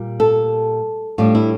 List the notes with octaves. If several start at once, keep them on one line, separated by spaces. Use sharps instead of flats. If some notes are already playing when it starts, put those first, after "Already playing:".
Already playing: A#2 G3
A4
A2 G3 D4 F4
E4